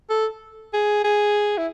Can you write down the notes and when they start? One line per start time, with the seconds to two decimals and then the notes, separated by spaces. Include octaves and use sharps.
0.10 A4
0.74 G#4
1.04 G#4
1.58 E4